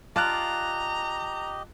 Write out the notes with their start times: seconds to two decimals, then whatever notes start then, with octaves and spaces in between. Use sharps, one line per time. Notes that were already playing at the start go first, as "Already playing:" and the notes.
0.16 F4 G4 D5 D#5 A5 A#5 F#6